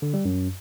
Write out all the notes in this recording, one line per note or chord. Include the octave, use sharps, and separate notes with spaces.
D3
G3
F#2